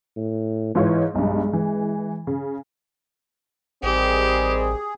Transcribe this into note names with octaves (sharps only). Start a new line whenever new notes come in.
A2
G#2 E3 F4 C#5
B1 G2 G#3
E3
C#3
A1 D#3 G3 C4 G4 G#4